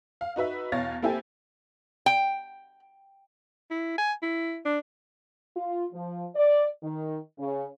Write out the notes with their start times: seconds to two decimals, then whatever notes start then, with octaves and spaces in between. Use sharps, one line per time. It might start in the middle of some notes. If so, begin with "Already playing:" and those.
0.21 F5
0.36 D#4 F#4 B4 E5
0.72 E2 B2 C#5 F5 A6 A#6
1.02 A#3 C4 E4 G4 A4 G#5
2.06 G5
3.71 E4
3.98 G#5
4.22 E4
4.65 D4
5.56 F4
5.93 F3
6.35 D5
6.83 D#3
7.38 C#3